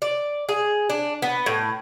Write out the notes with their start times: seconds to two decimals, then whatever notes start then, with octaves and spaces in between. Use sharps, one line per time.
0.02 D5
0.49 G#4
0.90 D4
1.22 B3
1.46 A2